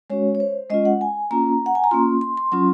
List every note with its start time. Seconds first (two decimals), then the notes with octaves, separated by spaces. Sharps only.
0.10 G#3 C#4 F#4 C#5
0.35 C#5
0.40 C5
0.70 G#3 C#4 F4 D#5
0.85 F#5
1.01 G#5
1.31 A#3 C#4 F4 A#5
1.66 F#5
1.75 G#5
1.84 A#5
1.91 A#3 C#4 F4 C6
2.21 C6
2.37 C6
2.52 F#3 C#4 F4 C6